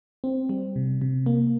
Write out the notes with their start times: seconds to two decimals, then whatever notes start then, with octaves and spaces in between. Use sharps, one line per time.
0.24 C4
0.49 G3
0.76 C3
1.02 C3
1.26 A#3